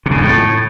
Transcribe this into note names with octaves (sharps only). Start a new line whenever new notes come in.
C3
C#3
F2
A2